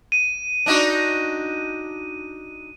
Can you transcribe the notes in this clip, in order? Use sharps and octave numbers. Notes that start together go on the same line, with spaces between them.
D#7
D4 D#4 F#4